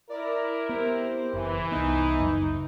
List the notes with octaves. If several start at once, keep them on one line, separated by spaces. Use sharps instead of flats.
E4 A#4 D5
B3 C4 G4 C5
F#1 E3
C2 B3 D#4
F#1 C#2 F#2